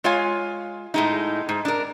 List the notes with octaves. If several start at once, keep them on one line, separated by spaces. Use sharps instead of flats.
G#3 F4 C#5 F5 G#5
A2 G#3 D#4
G#2
D4 A#4